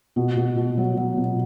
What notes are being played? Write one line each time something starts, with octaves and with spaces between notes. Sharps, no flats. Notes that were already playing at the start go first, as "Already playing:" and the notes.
B2
B2
B2
F#3
F#3
B2